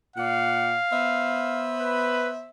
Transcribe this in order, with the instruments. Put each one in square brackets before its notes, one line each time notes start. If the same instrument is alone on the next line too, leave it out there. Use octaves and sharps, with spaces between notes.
[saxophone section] A#2 D5 F#5 [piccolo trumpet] F5
[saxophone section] B3 C5 E5
[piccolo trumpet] B4